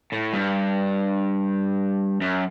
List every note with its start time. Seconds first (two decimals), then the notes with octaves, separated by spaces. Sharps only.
0.13 A2
0.34 G2
2.21 F#2